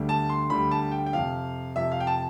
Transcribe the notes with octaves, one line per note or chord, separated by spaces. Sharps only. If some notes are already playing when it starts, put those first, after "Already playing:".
Already playing: D2 D3 G3
A5
C6
D2 D3 G3 B5
A5
G5
G5
F2 C3 F3 F5
F2 C3 F3 E5
F5
G5
A5